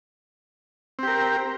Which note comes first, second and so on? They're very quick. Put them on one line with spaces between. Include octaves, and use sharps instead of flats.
C4 G4 A#4